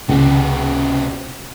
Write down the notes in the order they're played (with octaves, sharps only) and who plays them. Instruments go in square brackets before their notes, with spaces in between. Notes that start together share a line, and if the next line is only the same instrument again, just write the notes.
[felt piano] C#2 [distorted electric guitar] C3 F#4